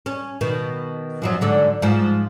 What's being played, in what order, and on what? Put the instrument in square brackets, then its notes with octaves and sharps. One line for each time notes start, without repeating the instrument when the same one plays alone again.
[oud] C#4
B2 D#3
F#2 F3 F#3
G#2 D3 F#3
G#2 F3